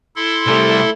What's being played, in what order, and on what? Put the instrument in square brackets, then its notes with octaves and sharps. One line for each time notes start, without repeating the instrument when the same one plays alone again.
[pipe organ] E4 A4 C6
[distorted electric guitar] C2 G3 [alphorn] A3